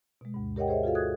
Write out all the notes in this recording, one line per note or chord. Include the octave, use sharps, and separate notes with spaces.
B2 G#3
D2 G2
G4 A#4 C#5 D#5 F#5 G5
G#4 C5 C#5 D#5 E5
F4 F#4 G#4 A4 F5
A4 D#6 F#6 G#6